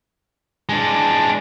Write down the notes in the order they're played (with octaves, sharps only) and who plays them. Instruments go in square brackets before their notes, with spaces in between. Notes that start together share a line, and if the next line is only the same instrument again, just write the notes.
[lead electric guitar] G#3 D4